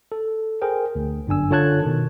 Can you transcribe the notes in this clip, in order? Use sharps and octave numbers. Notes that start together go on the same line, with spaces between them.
A4
G#4 A#4 C5 G5 G#5
D2
G1 F#2 D4 G#5 E6
D3 F4 C#5 A5 F#6 G#6
B2 D#3